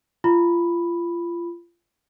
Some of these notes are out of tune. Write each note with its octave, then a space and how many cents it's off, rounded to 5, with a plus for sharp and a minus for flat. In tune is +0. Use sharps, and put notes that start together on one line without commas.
F4 -25 B5 +0